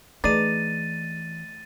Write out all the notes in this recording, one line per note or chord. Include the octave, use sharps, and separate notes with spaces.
E3 A3 D#4 G#4 B4 D5 A6 D#7